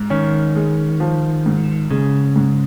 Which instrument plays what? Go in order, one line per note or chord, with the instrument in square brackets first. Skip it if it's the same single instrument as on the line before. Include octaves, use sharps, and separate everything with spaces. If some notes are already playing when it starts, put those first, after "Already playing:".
Already playing: [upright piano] G#2
[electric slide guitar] D#3 [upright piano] C#4
[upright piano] G#3
F3
G#2
[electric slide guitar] C#3 [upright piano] G#3
[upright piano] G#2